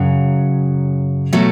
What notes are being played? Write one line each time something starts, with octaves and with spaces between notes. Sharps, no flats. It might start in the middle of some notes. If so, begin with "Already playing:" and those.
Already playing: F#2 C#3 F#3
B2 F#3 A3